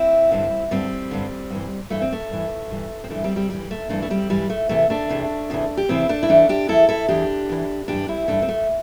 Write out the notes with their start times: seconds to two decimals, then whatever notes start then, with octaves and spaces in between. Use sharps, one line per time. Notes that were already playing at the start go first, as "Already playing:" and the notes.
Already playing: C4 E4
0.31 G2 D3
0.71 G2 D3 G3 C4
1.11 G2 D3
1.50 G2 E3
1.90 G2 E3 A3
2.02 C4
2.12 A3
2.30 G2 E3
2.70 G2 E3
3.04 C4
3.10 G2 E3 A3 D4
3.24 G3 C4
3.36 G3 C4
3.50 G2 E3 G3
3.71 A3
3.89 G2 E3 A3 D4
4.02 A3
4.10 G3 C4
4.30 G2 E3 G3
4.50 A3
4.69 E2 C3 E3 A3
4.90 A3 D4
5.09 E2 C3 E3
5.50 E2 C3 E3
5.77 G4
5.89 E2 C3 E3 C4 E4
6.09 A3 D4
6.23 E4
6.29 E2 E3 A3 D4
6.49 D4 G4
6.68 E2 E3 E4 A4
6.89 E4 A4
7.08 E2 E3 D4 G4
7.49 E2 E3
7.88 G2 E3 D4 G4
8.08 C4 E4
8.28 G2 E3 A3 D4
8.42 C4
8.49 A3